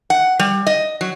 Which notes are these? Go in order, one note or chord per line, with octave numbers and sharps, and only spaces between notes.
F#5
G3
D#5
F#3